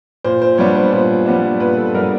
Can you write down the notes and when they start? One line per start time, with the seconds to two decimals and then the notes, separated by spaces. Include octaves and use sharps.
0.24 A#2 C5
0.42 C5
0.58 G3 B3 D4 C#5
0.75 C5
0.92 A#2 C5
1.26 G3 B3 D4
1.60 A#2 B4
1.77 A4
1.94 G3 B3 D4 A#4